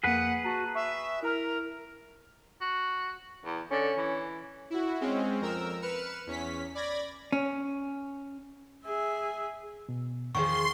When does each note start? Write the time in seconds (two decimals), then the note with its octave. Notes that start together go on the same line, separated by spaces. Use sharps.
0.04 F2 A#3 G#4 B4 F#5
0.44 F#4 A5 A#5
0.75 E5 C#6
1.22 E4 A#4 A#5 F6
2.61 F#4
3.45 E2
3.71 D3 C#4
3.98 E3
4.70 E4 F#4
5.01 G#3 C4 C#4
5.40 F2 A#4 E6
5.82 B4 F6 C#7 E7
6.27 E2 C#4 B6
6.75 D5 B5 G#6 A#6
7.32 C#4
8.85 G#4 E5
9.89 B2
10.35 E2 D#3 F3 G#4 C6 C#6